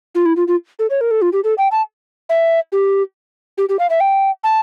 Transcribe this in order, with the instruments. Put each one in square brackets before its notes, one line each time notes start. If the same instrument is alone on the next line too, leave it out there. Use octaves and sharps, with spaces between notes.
[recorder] F4
E4
F4
F4
A4
C#5
A#4
A4
F4
G4
A4
G5
A5
E5
G4
G4
G4
F5
E5
G5
A5